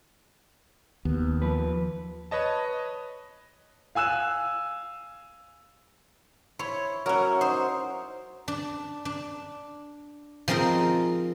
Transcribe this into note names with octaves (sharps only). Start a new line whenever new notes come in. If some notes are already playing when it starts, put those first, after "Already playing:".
D#2 B3
F3 B4
B4 C#5 D#5 A5
F5 G#5 E6 F#6 E7
E4 C#5 C6
F#3 C#4 A#4 E5 F#5
D#4 C5
D4
D4
F3 G#3 C4 D#4 A#4